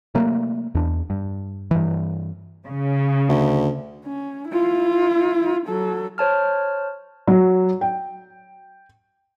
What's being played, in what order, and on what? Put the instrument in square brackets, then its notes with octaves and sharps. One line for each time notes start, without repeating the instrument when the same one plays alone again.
[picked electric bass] C3 F#3 A3 A#3
E2 D4
G2
G2 E3
[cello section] C#3
[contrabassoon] D2
[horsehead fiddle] C#4
E4 F4
F#3 A4
[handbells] C5 C#5 A5 F6
[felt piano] F#3
G5